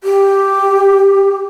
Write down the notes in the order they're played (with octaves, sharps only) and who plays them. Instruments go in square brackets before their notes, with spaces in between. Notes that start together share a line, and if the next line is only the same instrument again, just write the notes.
[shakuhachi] G4